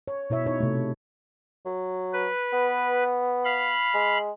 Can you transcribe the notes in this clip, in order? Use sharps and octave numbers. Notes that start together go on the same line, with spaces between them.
C#5
B2 E4 C#5 E5
D#4 C#5
C3 A3
F#3
B4
B3
F5 B5
G#3